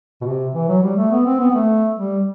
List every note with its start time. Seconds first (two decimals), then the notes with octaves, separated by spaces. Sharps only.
0.21 B2
0.26 C3
0.55 E3
0.68 F#3
0.82 G3
0.97 A3
1.11 B3
1.26 C4
1.40 B3
1.50 B3
1.54 A3
1.97 G3